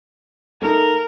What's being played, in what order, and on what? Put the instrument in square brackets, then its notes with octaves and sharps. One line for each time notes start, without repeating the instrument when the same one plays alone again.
[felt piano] A3 D#4 [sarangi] A#4